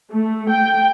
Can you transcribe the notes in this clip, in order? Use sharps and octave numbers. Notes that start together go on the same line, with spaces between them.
A3
G5